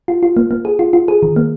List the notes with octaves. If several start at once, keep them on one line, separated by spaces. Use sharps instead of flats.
F4
F4
A#3
A#3
G#4
F4
F4
G#4
D#3
A#3